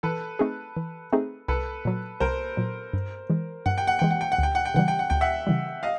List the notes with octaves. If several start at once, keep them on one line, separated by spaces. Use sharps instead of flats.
E3 A4 B4
A3 C4 D#4 G#4
E3
A3 C4 D#4 G#4
C2 A4 B4
A#2 F#3
C2 A#4 C5
A#2 F#3
G2
E3 G#3
G2 F#5
G5
F#5
E3 G#3 G5
F#5
G5
F#5
D2 G5
F#5
G5
C#3 E3 G3 F#5
G5
F#5
D2 G5
E5 F#5
C#3 E3 G3
D#5 F5